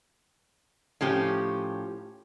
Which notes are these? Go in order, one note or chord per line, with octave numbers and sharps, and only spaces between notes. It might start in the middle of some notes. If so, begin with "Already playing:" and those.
A2 F3 C#4 G4